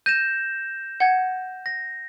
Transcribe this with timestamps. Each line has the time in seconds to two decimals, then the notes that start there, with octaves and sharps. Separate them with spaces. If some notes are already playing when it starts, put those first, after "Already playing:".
0.06 G6 A#6 D#7 E7
1.00 F#5 G#6
1.66 A#6